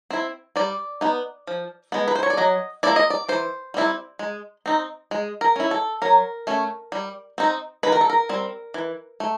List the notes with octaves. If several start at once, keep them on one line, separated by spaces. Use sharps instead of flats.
C4 E4
G3 D5
B3 D#4
F3
G#3 B3
B4
C5
C#5
D5
F#3 D#5
A#3 C#4 E4 D5
D#5
D5
E3 C5
G3 C4 E4
G#3
C4 D#4
G#3
A#4
C#4 E4
A4
F#3 A#4
A3 C#4
G3
C4 D#4
D#3 B4
A#4
A4
A#4
G3 C4
E3
A3